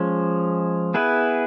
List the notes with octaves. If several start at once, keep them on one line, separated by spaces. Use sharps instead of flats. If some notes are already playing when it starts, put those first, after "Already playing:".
Already playing: F3 G#3 C#4
B3 E4 G#4 B4